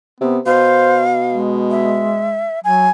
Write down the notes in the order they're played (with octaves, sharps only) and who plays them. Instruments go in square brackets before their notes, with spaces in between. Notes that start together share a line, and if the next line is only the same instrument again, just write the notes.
[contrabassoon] C3 [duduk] B3
[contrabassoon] B2 [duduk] C5 [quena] F5
[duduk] G#3
[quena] E5
[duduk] F#3 [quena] G#5